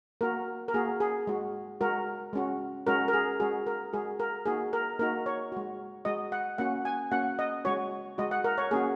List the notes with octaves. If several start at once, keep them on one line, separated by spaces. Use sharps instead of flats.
A#3 F#4 A#4
A#4
A#3 F#4 G#4
G#4
G#3 F#4
G#3 F#4 A#4
G#3 C#4 F#4
G#3 C#4 F#4 A#4
A#4
G#4
G#3 F#4 G#4
A#4
G#3 F#4 G#4
A#4
A#3 D#4 F#4 G#4
A#4
A#3 D#4 F#4 A#4
C#5
G#3 F#4
G#3 F#4 D#5
F#5
A#3 C#4 F#4 F#5
G#5
A#3 C#4 F#4 F#5
D#5
G#3 F#4 C#5
G#3 F#4 D#5
F#5
A#4
C#5
A#3 C#4 F#4 G#4